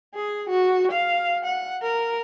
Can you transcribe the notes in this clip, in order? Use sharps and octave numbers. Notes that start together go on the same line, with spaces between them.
G#4
F#4
F5
F#5
A#4